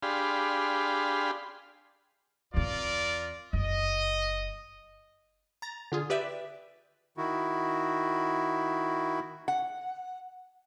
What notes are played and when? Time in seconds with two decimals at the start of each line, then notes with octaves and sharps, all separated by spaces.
0.03 D4 G4 G#4 F5 B5 C6
2.54 E2 C4 F4 A#4 D5
3.53 F#1 D#5
5.62 A#5 A6
5.92 D3 F4 G#4
6.10 G4 B4 D5 E5
7.17 D#3 E4 F#4
9.48 F#5